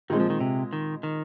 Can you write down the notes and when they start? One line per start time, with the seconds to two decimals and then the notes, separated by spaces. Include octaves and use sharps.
0.10 A#2 D#3 G#3 C4
0.20 F3
0.30 D#3
0.41 C3
0.73 D#3
1.03 D#3